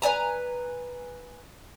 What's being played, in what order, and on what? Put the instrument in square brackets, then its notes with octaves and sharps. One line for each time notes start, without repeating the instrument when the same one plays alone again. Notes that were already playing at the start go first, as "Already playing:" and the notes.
[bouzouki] B4 D5 G#5 A#5